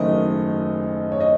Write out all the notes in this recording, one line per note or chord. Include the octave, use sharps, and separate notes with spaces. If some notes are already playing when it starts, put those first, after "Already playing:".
Already playing: F#1 F#2 D#3 A3 D#5
C#5
D#5